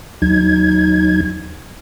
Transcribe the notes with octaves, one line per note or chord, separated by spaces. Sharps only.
D#2 F#3 D#4 G#6